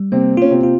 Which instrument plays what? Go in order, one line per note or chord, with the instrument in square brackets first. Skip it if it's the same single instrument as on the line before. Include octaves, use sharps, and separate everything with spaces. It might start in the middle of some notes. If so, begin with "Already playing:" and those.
Already playing: [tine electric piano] G3
[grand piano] C3 C4 [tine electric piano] A#3
[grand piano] C#4 [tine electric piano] F4
[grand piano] C3 C4
[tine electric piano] F4